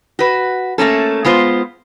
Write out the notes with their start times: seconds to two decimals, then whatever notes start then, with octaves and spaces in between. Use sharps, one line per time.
0.19 F#4 B4
0.78 A3 A#3 C#4 A4
1.25 G#3 B3 F4 C5